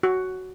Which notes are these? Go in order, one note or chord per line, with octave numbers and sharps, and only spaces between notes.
F#4